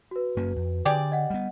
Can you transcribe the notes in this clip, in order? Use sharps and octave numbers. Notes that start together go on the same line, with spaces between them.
F#4 B4
F#2 A#3 C#4
F2
D3 G4 G#4 D5
D#5 F#5
G3 B3